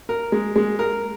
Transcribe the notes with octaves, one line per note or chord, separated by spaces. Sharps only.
A#4
G#3
G#3
A#4